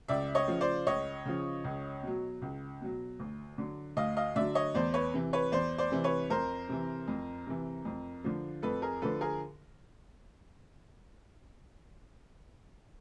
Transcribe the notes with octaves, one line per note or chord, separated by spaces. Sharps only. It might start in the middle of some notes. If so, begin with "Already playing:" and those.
C#2 D5 E5
C#5 D#5
C#3 F3
C5 D5
C#2 C#5 D#5
C#3 F3
C#2
B2 F#3
C#2
B2 F#3
D2
D3 F#3
D2 D#5 F5
D#5 F5
D3 F#3 D5 E5
C#5 D#5
E2 C5 D5
B4 C#5
C3 E3
B4 C#5
E2 C5 D5
C5 D5
C3 E3
B4 C#5
F2 A#4 C5
C3 E3
F2
C3 E3
F2
D3 F3
F2 A4 B4
G#4 A#4
D3 F3 A4 B4
G#4 A#4